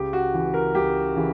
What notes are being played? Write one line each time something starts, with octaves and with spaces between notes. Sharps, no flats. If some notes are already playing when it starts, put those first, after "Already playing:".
Already playing: C#2 G4
F#4
C#3 E3
A#4
C#2 G4
C#3 E3